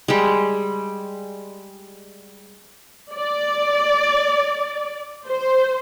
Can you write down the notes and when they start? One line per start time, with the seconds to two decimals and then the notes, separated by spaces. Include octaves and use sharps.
0.08 G3 G#3
3.14 D5
5.28 C5